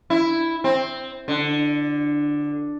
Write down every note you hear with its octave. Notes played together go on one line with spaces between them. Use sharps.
E4
C4
D3